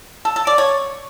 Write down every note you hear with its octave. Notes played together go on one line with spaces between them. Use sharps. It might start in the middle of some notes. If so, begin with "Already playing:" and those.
A4
A4
D5
C#5